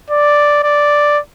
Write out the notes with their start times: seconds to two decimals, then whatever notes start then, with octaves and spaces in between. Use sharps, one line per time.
0.10 D5
0.63 D5